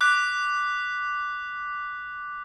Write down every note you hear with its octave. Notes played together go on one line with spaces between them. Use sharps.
D6 F#6 B6